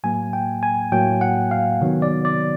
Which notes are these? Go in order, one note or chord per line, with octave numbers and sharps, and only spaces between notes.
A2 F#3 A#3 G#5
G5
G#5
A2 F#3 A#3 G5
F#5
F5
C3 D#3 F#3 B3
D5
D5